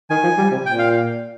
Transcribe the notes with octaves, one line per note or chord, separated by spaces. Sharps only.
D#3 G#5
F3
G3
C3
A#2 G5
F5